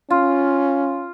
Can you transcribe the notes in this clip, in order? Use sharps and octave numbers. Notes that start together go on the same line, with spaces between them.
C#4 F4